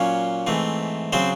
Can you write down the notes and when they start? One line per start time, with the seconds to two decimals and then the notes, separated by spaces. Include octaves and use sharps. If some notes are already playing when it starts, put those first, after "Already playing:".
Already playing: A#2 F#3 A#3 C#4 C#5
0.47 G#2 E3 A3 C4
1.13 C#3 F#3 C4 C5